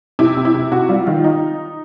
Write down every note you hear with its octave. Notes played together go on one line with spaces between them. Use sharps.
C3 E4
C3
E4
C3
C3 F#4
G3 F4
D#3 F4
D#4